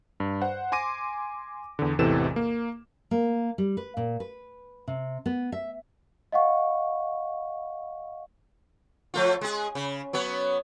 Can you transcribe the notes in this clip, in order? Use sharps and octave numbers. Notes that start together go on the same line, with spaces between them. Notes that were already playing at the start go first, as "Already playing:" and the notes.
G2
C5 F#5
G#5 C6 D6 A#6 D#7
E2 D3
A1 E2 C3 E3 A4 E7
A#3
A#3
G3
B4
A#2
B4
C3
B3
E5
D#5 F5 F#5 C#6
F3 A3 F4
G#3 G#4
C#3
F#3 B3 C#5